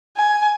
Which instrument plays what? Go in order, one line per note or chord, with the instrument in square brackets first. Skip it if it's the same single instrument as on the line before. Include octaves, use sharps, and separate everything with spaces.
[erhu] G#5